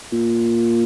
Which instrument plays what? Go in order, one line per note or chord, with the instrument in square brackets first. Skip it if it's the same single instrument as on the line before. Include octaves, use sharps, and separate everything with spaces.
[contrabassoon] A#2